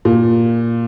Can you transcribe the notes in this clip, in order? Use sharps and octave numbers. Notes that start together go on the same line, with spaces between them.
A#2